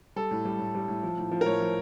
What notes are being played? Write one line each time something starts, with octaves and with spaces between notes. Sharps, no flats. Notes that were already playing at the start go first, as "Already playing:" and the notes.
G3 A4
A2
G3
A2
G3
A2
F3
A2
F3
A#4
A2 C#5
F3